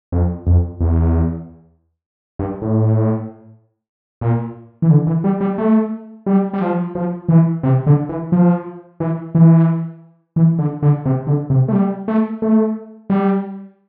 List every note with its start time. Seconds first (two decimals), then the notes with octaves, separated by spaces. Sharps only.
0.12 F2
0.47 F2
0.80 E2
2.39 G2
2.62 A2
4.21 A#2
4.82 E3
4.90 D3
5.07 E3
5.24 G3
5.41 G3
5.58 A3
6.26 G3
6.54 G3
6.61 F3
6.95 F3
7.29 E3
7.63 C3
7.87 D3
8.09 E3
8.32 F3
9.00 E3
9.35 E3
10.36 E3
10.59 D3
10.82 D3
11.05 C3
11.27 D3
11.50 C3
11.68 A3
11.73 G3
12.08 A3
12.42 A3
13.10 G3